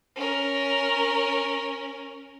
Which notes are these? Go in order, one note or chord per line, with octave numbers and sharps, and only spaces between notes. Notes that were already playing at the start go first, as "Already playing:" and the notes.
C#4 A#4